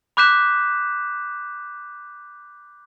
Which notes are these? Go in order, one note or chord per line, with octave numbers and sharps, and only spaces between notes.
B5 D6 F#6 G6 B6 E7